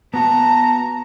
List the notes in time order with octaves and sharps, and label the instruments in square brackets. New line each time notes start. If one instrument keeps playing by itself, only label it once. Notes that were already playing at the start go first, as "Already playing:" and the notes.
[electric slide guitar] B3 F#4 [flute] A5 [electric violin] A#5